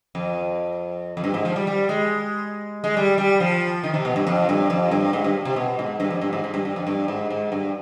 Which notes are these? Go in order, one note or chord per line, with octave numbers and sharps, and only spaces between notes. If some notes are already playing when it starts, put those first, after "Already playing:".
F2
F2
G2
G#2
F3
G3
G3
G#3
G#3
G3
G3
F3
D#3
C3
B2
G2
F2
G2
F2
G2
G#2
G2
C3
B2
G#2
G2
F2
G2
G#2
G#2
G2
G2
F2
G2
G#2
G#2
G2